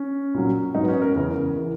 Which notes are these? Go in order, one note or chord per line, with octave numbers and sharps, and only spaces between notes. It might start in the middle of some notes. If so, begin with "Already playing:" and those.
Already playing: C#4
A#2 F#3
G#2 F#3 D#4
B3
C#4
A#4
E2 C#3 E3 A#4
E3